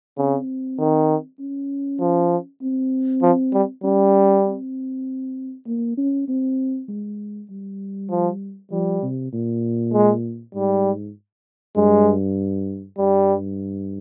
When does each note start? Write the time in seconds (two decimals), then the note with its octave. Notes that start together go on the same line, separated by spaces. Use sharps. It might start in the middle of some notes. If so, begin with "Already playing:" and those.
0.18 C#3 C4
0.79 D#3
1.39 C#4
2.00 F3
2.62 C4
3.23 F3
3.54 G3
3.84 G3 C#4
4.45 C4
5.67 A#3
5.97 C#4
6.28 C4
6.88 G#3
7.50 G3
8.10 F3
8.71 F3 G3
9.02 C3
9.33 A#2
9.94 G#3
10.55 G#2 G3
11.76 G2 G#3
12.98 G2 G3